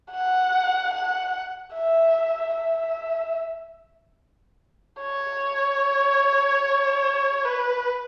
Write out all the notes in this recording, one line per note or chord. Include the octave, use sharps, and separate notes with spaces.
F#5
F#5
E5
E5
C#5
B4